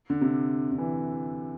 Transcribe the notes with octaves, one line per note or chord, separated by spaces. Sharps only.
D3
C3
D3
E3